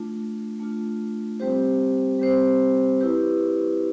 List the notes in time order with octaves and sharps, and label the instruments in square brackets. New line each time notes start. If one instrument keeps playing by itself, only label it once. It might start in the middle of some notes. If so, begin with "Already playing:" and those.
Already playing: [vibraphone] A3 D4 F4
A3 D4 F4
G3 C4 G4 C5
G3 C4 G4 C5
E4 G4 B4